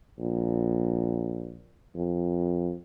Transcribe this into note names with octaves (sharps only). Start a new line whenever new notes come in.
A#1
F2